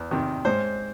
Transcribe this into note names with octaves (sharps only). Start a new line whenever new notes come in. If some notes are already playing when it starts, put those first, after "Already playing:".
Already playing: E2
C3 D#3
G#2 C5